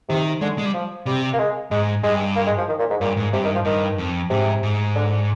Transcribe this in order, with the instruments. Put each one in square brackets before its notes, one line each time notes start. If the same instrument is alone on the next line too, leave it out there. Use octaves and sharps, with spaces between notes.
[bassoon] C3 [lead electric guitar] D#3
[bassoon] D3 [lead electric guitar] G#3
[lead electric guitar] G#3
G3
[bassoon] F3
[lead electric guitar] C3 [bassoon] G3
[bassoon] A#3
G#3
[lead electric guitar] G#2 [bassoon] G#3
[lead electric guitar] G2 [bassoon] G#3
[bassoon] A#3
G#3
F3
D#3
A#2
G#2
[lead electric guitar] G2 [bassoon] A#2
[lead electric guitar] G#2
[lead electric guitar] G2 [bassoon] C3
[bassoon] D#3
F3
[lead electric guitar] G2 [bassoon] D#3
[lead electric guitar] F2
[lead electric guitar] G#2 [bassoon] C3
[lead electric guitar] G#2
[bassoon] D3